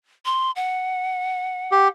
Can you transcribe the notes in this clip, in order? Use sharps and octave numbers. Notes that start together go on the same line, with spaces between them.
C6
F#5
G4